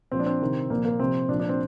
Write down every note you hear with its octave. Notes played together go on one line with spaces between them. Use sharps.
A#2 F3 C4
D4
C4
C3 D#3
A#2 F3 A#3
A#3
C3 F3 C4
A#2 F3 D4
D4
C4